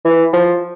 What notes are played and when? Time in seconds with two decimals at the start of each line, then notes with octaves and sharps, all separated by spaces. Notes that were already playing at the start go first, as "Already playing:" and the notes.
0.05 E3
0.33 F3